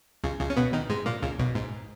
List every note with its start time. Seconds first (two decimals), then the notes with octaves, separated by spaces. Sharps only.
0.24 C#2 C#3
0.40 C#2 C#3
0.50 C#4
0.56 B2 B3
0.73 D#3 D#4
0.90 G#2 G#3
1.06 A#2 A#3
1.22 C#2 C#3
1.39 B1 B2
1.55 G#2